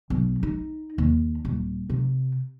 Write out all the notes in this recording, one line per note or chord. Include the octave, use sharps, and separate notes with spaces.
B1
D#4
D#2
D#1
C3